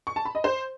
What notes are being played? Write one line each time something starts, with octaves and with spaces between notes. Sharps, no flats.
C#6
A5
B5
D#5
C5